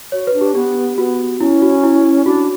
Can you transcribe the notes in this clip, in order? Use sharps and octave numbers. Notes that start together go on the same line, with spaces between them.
F#4 C#5
B4
D4
G4
B3 G4
B3 F#4
C#4 E4
F#4
E4
D4 F#4